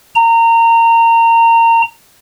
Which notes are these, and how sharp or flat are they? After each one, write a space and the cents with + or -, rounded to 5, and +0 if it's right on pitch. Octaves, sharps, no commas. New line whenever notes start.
A#5 -25